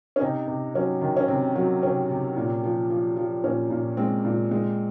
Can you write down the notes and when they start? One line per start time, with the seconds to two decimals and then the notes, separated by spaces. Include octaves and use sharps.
0.16 C#4
0.21 C3 D#4
0.47 C3
0.74 F#3 C#4
1.01 D#3
1.17 C#4
1.28 C3 C4
1.55 F#3
1.83 C3 C#4
2.10 C3
2.36 A#2
2.64 F3
2.90 F3
3.17 F3
3.44 A#2 C#4
3.70 A#2
3.97 G#3 C4
4.25 A#2
4.51 G#3